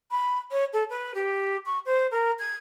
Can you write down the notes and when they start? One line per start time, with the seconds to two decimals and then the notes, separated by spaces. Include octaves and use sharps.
0.11 B5
0.51 C#5
0.73 A4
0.90 B4
1.14 G4
1.65 C#6
1.85 C5
2.11 A#4
2.39 G#6